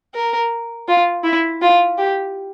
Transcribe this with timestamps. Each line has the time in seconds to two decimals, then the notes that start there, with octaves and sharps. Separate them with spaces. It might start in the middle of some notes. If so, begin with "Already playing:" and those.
0.14 A#4
0.88 F4
1.24 E4
1.62 F4
1.98 G4